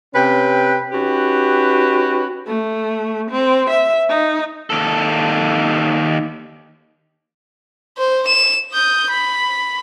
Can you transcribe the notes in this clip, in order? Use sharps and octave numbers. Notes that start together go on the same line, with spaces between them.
C3 C#4 B4 G5
C#4 D#4 F#4 G4 B4
A3
C4
E5
D#4
D#2 A4
C5
E7
D#6 G6
B5